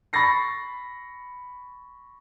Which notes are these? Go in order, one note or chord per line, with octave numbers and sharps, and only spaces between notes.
B5 C#6 A6 A#6 C7